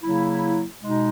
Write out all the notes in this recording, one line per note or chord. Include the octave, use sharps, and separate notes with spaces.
C#3 F#3 A#3 E4
B2 G#3 D#4